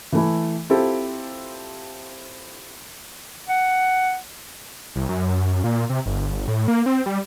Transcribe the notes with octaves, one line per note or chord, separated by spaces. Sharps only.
E3 A3 E4
C4 E4 F4 G4 A4
F#5
C2
F#2
A#2
C3
G1
A2
A#3
C4
G3